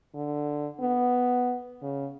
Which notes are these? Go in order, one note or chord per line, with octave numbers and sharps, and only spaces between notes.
D3
B3
C#3